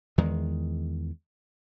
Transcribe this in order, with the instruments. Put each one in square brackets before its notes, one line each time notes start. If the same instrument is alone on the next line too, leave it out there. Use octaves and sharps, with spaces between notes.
[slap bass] E2 D#3 G#3